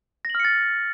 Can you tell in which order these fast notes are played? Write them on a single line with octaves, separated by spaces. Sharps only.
A#6 F#7 F6 C#7 A6